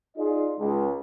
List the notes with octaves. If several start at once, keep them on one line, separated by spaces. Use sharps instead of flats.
D#4 F4 G#4 D5 D#5
C#2